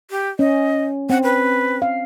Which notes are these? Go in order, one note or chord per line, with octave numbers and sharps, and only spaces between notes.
G4
C#4 D#5
C4 F#5
B4
F5